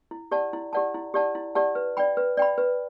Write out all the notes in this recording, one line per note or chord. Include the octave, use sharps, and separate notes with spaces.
E4
G4 D5 F#5 A5
E4
G4 D5 F#5 A5
E4
G4 D5 F#5 A5
E4
G4 D5 F#5 A5
B4
D5 G5 B5
B4
D5 G5 B5
B4